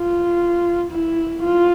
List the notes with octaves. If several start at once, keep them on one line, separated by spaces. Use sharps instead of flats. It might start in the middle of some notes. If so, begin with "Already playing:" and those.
Already playing: F4
E4
F4